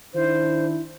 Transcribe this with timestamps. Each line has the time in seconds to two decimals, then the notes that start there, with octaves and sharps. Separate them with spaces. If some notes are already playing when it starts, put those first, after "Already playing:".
0.14 D#3 D4 E4 C5